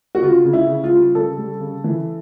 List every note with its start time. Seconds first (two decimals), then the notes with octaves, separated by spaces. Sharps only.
0.15 F#4
0.22 C#3 F4
0.45 C#3
0.53 E4
0.68 C#3
0.84 F4
0.92 G3
1.15 C#3 A4
1.38 G3
1.60 C#3
1.84 E3